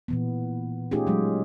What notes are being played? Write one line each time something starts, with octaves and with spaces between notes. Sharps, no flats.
A#2 E3 B3
A3 C#4 D#4 F4 G4 G#4
F#3 G#3